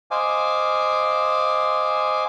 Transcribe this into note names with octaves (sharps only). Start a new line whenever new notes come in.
C5 D#5 F5 G#5 D6